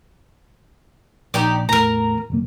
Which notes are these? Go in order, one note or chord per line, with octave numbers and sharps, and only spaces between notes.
A#1 D#4 G4 D5
E2 A2 A#4 A#5
F1 B1 A#3